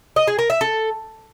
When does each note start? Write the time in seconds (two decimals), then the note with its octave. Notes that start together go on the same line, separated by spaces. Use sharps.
0.16 D#5
0.27 G#4
0.39 A#4
0.50 E5
0.61 A4